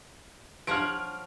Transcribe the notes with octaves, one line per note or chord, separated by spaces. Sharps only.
F3 C#5 F#5 F6 D7